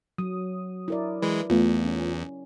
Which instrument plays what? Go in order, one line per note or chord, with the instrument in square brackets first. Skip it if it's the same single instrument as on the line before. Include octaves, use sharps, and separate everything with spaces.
[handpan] F#3 [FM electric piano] D#6
[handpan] E4 A#4 D5
[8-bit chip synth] E3 G#3 [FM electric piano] B4
[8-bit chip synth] E2 [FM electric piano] A3 B3 F4
[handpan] C#4